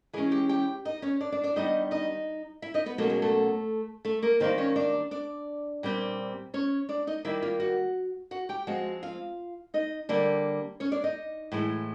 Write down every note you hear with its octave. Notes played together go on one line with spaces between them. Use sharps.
E3 G#3 C#4 G#4 G#5
G4 G5
G4 G5
D#4 D#5
C#4 C#5
D4 D5
D4 D5
D4 D5
D#3 G3 B3 D4 D#4 D#5
D#4 D#5
E4 E5
D#4 D#5
B3 B4
B2 F#3 A3 A#3 C#4 A4
G#3 G#4
A3 A4
A3 A4
A#3 A#4
D#3 G3 A#3 C4 C5
C#4 C#5
D4 D5
D4 D5
A#2 G3 C4
C#4 C#5
D4 D5
D#4 D#5
D#3 G3 A#3 E4 E5
F4 F5
F#4 F#5
F#4 F#5
G4 G5
F3 G#3 C4 F#4 F#5
F4 F5
D#4 D#5
D3 G3 A#3 D4 D5
C#4 C#5
D4 D5
D#4 D#5
A2 E3 G#3